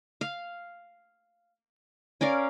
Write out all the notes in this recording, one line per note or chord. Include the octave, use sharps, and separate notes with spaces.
F5
C#4 A#4 D5 F5